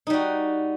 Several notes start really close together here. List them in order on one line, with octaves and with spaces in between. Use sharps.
D#4 G3 F#4